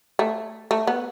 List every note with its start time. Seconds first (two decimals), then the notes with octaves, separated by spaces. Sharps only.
0.19 A3
0.71 A3
0.87 B3